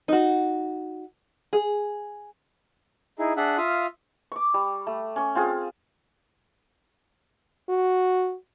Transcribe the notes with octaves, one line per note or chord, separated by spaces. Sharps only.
D#4 F#4
G#4
D#4 E4 G#4
D4 G#4 E5 F#5
F4 E5 F5 D#6
C#6 D6
G3
A3
C#4 C#6
C4 F4 G#4
F#4